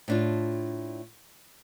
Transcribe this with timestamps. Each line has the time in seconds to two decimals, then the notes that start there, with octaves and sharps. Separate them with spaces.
0.08 A2 D4 F4